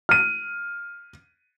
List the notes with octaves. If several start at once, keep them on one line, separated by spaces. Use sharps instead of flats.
F6 D#7